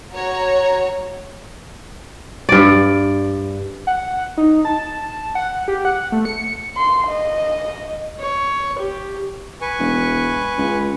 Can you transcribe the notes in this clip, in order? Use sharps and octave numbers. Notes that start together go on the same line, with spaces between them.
F#4 C#5 A#5
G2 D5
F#5
D#4
A5
F#5
G4
F#5
A3
C#7
C6
D#5
C#5
G4
B4 G#5 C#6
E1
C#2